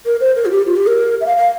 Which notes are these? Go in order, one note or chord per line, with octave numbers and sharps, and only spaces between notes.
A#4
C5
A#4
F4
G4
F4
G4
A#4
E5
F5
F5